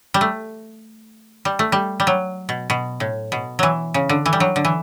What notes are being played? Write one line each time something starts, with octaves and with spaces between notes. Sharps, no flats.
G3
A3
G3
A3
G3
G3
F#3
B2
B2
A2
B2
E3 F#3
C#3
D3
E3
G3
F#3
D3
E3